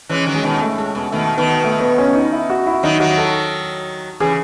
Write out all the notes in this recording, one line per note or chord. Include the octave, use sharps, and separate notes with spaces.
E3 G#3 C#4
D#3 F#3
G#3
B2 D#3
A3
A2 G#3
B2 G#3
B2 D#3 A3
B2 D#3 B3
A3
B3
C#4
D#4
E4
F#4
E4
D#3 F#3 D#4
D#3 F#3 F#4
A4
C#3 E3 G#4